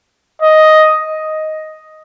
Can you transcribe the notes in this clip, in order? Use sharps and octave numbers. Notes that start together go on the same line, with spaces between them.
D#5